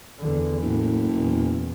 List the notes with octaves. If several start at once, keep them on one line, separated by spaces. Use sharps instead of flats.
E2 D3
F#1 A2
E2 A#2